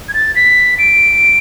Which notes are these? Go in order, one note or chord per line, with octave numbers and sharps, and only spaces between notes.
G#6
A6
B6
D7